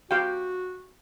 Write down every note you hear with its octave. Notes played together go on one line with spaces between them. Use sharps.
F#4 G4 F5 G5